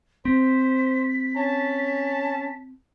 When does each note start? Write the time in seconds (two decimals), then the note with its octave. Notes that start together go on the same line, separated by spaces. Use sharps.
0.25 C4 C5 B6
1.36 C#4 A5